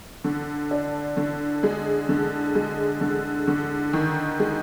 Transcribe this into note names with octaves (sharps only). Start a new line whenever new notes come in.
D3
D4
D3
G#3
D3
G#3
D3
D3
D#3
G#3